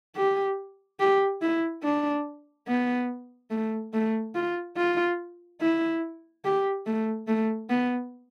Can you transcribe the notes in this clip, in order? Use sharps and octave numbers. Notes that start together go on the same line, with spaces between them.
G4
G4
E4
D4
B3
A3
A3
F4
F4
E4
G4
A3
A3
B3